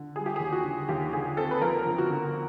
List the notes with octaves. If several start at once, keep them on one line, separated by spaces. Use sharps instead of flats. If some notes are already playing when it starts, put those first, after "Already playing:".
Already playing: D3
G3 G#4
G4
D#2 G#4
F#4
D3
D#2 G4
D3 G#4
C4 A4
B4
F2 A#4
G1
F#4
D3